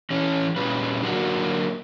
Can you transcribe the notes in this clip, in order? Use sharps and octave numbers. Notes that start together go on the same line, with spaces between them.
E3 C#4
A#2 C#3 G3 B4
D3 F#3 A#3 F#4